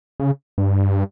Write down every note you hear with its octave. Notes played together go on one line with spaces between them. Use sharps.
C#3
G2